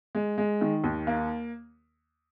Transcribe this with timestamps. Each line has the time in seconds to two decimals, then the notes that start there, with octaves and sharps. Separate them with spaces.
0.15 G#3
0.38 G#3
0.61 D#3
0.84 D#2
1.07 A#3